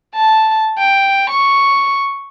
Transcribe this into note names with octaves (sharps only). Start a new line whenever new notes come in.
A5
G5
C#6